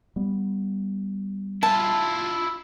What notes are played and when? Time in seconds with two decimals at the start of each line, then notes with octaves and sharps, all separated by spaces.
0.16 G3 B3
1.63 E4 F4 A5